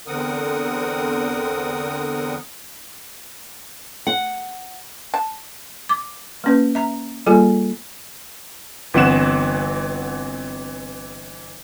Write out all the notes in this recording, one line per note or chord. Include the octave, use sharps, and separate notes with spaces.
E2 D3 C4 A#4 F#5 D#6
F#5
A5
D6
A#3 C#4 B4
E5 A#5
G3 A#3 F4 G#4 A4 G#5
G1 E3 C4 F#5 E7